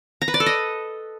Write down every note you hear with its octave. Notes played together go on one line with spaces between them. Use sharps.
A#5
B4
D5
A4
D#5